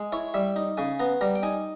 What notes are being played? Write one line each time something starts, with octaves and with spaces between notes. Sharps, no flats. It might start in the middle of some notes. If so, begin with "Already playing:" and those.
Already playing: G#3
E4 C#5
G3 E5
D#4
C#3 G#5
B3 A#5
G3 A#5
G5
D#4 G#5